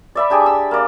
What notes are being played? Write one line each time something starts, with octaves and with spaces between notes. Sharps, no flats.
D5 E5 B5
D4 G4 G#4
E6
A#3 D5